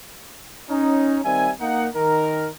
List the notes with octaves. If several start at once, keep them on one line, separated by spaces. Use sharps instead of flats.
C#4 D#4
D#3 G3 C4 E5 G#5
A#3 D#4 F#5
D#3 A#4